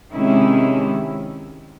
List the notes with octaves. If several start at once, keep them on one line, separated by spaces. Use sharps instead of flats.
C3 D#3 G#3 C#4 E4